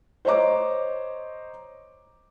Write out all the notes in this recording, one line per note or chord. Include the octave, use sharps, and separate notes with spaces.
C5 C#5 D#5 A#5 D6